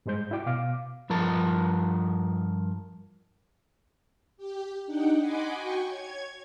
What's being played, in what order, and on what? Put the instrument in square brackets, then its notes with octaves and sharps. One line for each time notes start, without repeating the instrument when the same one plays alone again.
[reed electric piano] G#2 G3 G#3 C5 G6
E4 F#4 D5 G5 D6
B2 F5 D6
[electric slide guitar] G2 F3 A#4 A5
[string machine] G4
D4 D#4 F#5 G5
D#5 F#5 G#5 B5 C6 D6
F#4 G5 G#5 C#6
C#5 G#6